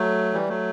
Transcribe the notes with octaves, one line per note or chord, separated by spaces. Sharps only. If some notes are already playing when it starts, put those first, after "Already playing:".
Already playing: F#3 A3
E3 G3
F#3 A3